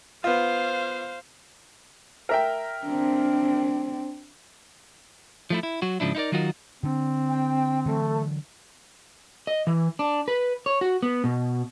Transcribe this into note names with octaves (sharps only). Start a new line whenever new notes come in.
B3 F4 C5 F5
A#4 E5 G5
C4 D4
F3 A3 E4
E4
F#3 F#4
G#2 C#3 F3 D4 E4
D#4 E4 A#4 D5
D#3 F#3 D#4 F4 F#4 A#4
D3 C4 D4
G5
D3 E3 F#3 A3
D#5
E3
D4
B4
C#5
F#4
B3
B2